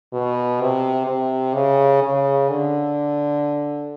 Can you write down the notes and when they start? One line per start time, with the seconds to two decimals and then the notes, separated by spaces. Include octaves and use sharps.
0.13 B2
0.61 C3
1.07 C3
1.54 C#3
2.02 C#3
2.49 D3